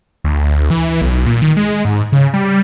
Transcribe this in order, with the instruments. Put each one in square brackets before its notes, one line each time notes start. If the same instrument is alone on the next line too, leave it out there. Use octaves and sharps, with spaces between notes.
[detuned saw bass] D2
E3
B1
A#2
D#3
G#3
G#2
C#3
G3